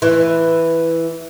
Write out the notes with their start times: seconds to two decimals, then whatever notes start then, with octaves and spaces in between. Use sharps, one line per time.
0.02 E3